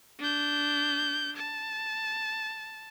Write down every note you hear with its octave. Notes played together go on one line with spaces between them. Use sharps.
D4 G6
A5